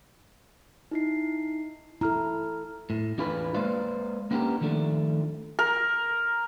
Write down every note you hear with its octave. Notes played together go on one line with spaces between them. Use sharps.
D#4 E4 C7
E4 A4 A#5 F6
A2
E2 D4 F4 G#4 B4
G#3 A#3 B4 C5 D5 F5
A#3 B3 C#4 D4 G4 A#4
D#3 F3 A3 D4
A#4